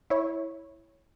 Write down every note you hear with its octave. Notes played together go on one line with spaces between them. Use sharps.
E4 C#5